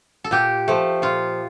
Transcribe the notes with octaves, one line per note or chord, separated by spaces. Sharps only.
A4
A#2 G4
F3 A3
A#2 F4